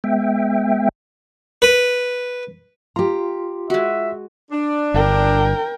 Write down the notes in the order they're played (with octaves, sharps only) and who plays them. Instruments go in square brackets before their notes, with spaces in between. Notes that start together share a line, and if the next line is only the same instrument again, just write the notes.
[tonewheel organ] G#3 B3 E5 G5
[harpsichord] B4
[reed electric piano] F4 C6 [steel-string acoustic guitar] G4 A#5
[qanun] G#3 F#4 [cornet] E5
[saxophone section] D4
[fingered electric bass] G1 [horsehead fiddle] A#4 G5